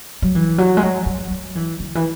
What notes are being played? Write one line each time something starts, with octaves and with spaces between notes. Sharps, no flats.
F#3
E3
F#3
G#3
F#3
F#3
F#3
E3
D3
E3